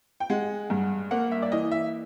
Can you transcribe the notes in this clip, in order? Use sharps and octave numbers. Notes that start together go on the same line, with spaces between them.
G5
G#3 F#5
G2
A#3 F#5
E5
D5
E3 D#5
E5